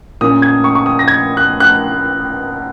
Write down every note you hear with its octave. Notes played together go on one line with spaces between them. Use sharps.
A#2 A#3 C#4 D#6
G#6
C#6
C#6
D#6
A#6
G#6
F#6
F#6